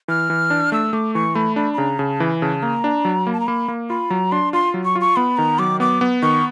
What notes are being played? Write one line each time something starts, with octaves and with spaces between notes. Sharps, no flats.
E3 F6
E3
D4
A3 E6
A3 D6
E3 C#6
A3 B5
D4 B5
B5
C#3 A#5
C#3 A5
E3
C#3 A5
A#3 A#5
D4
F#3
A#3 B5
A5
A#5
A#3 B5
A#3
F4 B5
F#3 A#5
D4 C6
F4 C6
F#3
C#6
F4
C#6
B3 B5
D#3 A#5
F#3 D6
B3 D6
B3
D#3 C#6